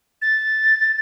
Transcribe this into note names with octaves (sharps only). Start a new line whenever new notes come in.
A6